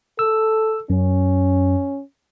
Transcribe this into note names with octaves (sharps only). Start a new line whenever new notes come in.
A4 E6
F#2 C#4